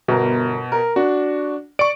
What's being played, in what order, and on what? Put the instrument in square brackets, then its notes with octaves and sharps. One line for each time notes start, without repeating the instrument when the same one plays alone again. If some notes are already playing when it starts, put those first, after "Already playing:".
[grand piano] G1 A#4 [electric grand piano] B2
[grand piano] A#4
[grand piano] D4 [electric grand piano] F#4
[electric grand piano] D5 C#6 [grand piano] D7